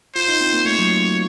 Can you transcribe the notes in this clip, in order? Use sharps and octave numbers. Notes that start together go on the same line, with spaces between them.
F4 C5
D#4
C4
A#3
A3 C#5
F#3